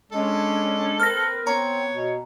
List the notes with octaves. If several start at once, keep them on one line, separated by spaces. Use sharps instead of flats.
G#3 C#4 D4 A4
C4 A#4 B4 F6 A#6
B3 C4 C#5 A#5
B2